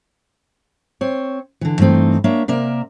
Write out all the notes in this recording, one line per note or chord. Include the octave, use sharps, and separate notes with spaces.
C4 C#5
D3 E3
G2 E3 A3 C4 D#4
A#3 D4 C#5 E5
C3 A#3 A#4 D5 E5